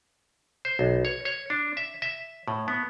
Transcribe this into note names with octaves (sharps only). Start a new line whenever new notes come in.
C5
B1
C#5
C#5
D4
E5
E5
A2
B3